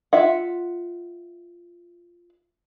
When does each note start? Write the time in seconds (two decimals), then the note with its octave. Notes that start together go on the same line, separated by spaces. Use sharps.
0.13 F4 E5 F#5